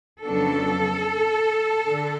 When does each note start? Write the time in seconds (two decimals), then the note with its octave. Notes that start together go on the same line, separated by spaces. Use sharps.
0.23 F2 C#3 F#3 B3 D4 A4
1.88 D3